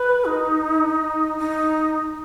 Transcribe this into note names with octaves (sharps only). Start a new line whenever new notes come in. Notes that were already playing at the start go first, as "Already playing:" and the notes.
Already playing: B4
D#4
D#4